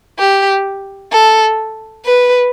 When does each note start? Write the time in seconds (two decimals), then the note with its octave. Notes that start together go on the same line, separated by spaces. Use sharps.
0.19 G4
1.12 A4
2.05 B4